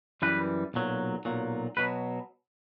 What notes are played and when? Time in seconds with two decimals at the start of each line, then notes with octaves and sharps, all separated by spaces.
0.22 F#2 E3 G3 B4
0.74 B1 A#2 F#3
1.25 B1 A#2 F#3
1.77 B2 F#3 B4